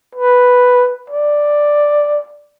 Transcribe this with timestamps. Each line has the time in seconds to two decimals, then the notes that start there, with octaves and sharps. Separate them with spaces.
0.15 B4
1.10 D5